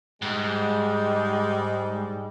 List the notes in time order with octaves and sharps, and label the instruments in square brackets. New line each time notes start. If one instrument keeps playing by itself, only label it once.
[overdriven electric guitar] G#2 [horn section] G3 G#3